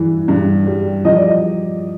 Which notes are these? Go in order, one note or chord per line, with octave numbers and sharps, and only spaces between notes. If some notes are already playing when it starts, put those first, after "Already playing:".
Already playing: G2 E3
G2
G3
F3 D#5
D5
D#5